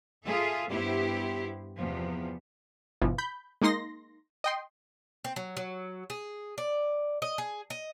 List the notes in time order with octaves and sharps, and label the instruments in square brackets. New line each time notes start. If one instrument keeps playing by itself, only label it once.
[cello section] F4 G#4 A4 E5
G2 B3 E4 G4 C5
E2 C3 F3 B3
[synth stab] G1 B2 E3 F3
B5 G6
G#3 A#3 D#4 C6 A#6
D#5 G5 C6
[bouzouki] C4
F#3
F#3
G#4
D5
D#5
G#4
D#5